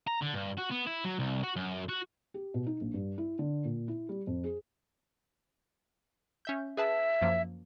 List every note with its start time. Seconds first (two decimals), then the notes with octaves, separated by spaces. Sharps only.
0.07 A#5
0.21 D3
0.34 G2
0.57 F#4
0.71 B3
0.86 E4
1.04 F#3
1.19 C2
1.43 F#4
1.56 F#2
1.89 F#4
2.34 G4
2.54 B2
2.67 D#4
2.81 A#1
2.94 G2
3.18 E4
3.39 D3
3.64 A#2
3.88 E4
4.09 G3
4.27 F2
4.44 G#4
6.45 C#4 E5 G6
6.77 G#4 B4 E5 A5
7.21 F#2 F3 A#3